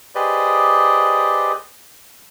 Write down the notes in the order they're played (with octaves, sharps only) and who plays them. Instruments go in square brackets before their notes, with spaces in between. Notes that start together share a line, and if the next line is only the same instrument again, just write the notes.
[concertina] G4 G#4 B4 C5 D5 D#5